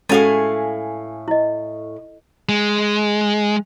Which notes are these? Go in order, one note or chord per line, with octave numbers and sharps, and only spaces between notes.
A2 G#3 C#4 F#4 A4 F5 G#5
E4 D#5
G#3